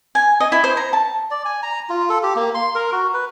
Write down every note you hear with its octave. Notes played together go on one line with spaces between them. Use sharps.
G#5
D#5
E4
C5
A#5
A5
D5
G#5
A#5
F4
A4
G4
A#3
C6
A#4
F#4
B4